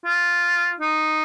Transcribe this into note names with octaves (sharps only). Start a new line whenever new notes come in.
F4
D#4